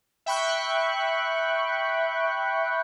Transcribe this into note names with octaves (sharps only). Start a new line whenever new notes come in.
E5 G5 B5 C#6 F#6